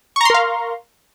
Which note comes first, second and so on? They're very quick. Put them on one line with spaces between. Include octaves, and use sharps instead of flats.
C#6 A#5 C6 A#4 F5